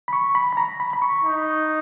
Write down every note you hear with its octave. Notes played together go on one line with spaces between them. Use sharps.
B5
C#6
B5
B5
A#5
B5
B5
C#6
D#4